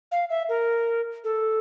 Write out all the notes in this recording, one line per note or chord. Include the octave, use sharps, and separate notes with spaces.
F5
E5
A#4
A4